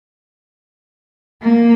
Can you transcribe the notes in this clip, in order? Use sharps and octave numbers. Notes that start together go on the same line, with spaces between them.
A#3